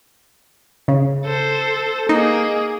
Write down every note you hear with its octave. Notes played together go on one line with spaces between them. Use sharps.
C#3
A4 C5
A#3 D#4 G#4